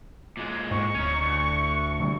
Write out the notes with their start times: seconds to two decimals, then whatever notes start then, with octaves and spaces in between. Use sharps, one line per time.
0.37 A#2 G#3
0.71 G#2 C#6
0.94 D1 C#4 D#4
1.21 D2
2.00 D3 E3 G3